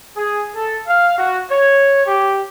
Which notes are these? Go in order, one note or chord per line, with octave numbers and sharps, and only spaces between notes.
G#4
A4
F5
F#4
C#5
G4